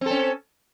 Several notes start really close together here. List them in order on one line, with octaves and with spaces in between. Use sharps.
C4 A4 C#4